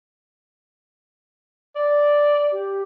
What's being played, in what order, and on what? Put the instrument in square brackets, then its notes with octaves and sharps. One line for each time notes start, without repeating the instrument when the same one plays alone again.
[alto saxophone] D5
[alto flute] G4